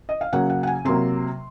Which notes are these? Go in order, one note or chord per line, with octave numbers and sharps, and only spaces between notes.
D#5
F5
C#3 F#3 A#3 F#5
F#5
F#5
G#5
C3 F#3 A#3 C6